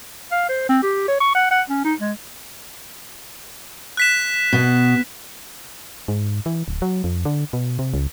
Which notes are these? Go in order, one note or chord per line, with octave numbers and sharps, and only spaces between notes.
F5
C5
C4
G4
C#5
C#6
F#5
F#5
C#4
D#4
G#3
F#6 B6 E7
B2
G#2
E3
D1
F#3
F2
D3
B2
C3
C#2